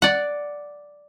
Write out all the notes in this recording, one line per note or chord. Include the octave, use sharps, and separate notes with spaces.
D5 F#5